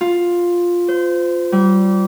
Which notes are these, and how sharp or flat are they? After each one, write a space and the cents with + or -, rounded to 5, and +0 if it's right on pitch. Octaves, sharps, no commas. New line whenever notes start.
F4 +5
C5 -30
G3 -25